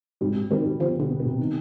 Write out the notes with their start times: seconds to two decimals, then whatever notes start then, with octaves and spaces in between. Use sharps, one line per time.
0.21 G#2 C3 G3
0.36 G3
0.51 C3 D#3 G3
0.66 G3
0.80 D3 F3 B3
0.95 B3
1.00 B2 D3
1.10 B3
1.20 B2
1.25 C3
1.39 D#3